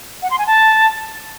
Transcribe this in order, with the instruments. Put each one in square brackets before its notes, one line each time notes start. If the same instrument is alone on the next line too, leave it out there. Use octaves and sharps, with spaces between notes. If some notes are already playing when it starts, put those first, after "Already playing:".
[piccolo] F#5
C6
G#5
A5